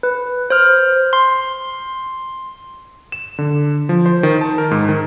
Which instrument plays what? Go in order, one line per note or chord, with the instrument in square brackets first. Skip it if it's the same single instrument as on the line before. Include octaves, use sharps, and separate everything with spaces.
[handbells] B4
C5 F6
C6
[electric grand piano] E7
D3
F3
C5
D#3
A5
A#4
G#2
D#3